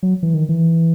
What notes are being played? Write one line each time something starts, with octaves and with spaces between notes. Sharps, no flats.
F#3
E3
D#3
E3